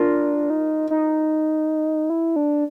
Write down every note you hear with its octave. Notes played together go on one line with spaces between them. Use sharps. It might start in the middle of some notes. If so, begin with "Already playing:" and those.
Already playing: D4 F4 A#4
D#4
D#4
E4
D4